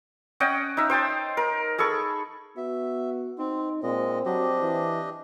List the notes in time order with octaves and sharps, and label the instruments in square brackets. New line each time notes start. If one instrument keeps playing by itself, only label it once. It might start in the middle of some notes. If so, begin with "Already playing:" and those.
[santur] C#4 D#5 F#5 G5
D#4 E5
C5 G5 A5 D#6
A#4
G#4 A4 B5 C#6
[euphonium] B3 [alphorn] F#4 [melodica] E5
[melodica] C4 [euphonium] D#4
[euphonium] A#2 [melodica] G#3 D#5 [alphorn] C4
[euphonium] F#3 [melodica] D4 G4 D#5
[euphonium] E3